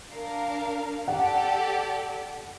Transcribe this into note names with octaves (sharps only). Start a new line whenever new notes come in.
D4 A#4 F5
G4 A4 D5 F#5